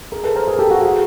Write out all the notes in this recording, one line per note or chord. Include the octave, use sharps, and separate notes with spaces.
G#4 A#4
A4 B4
A#4 C5
G#4 A#4
G4 A4
F#4 G#4
F#4 G#4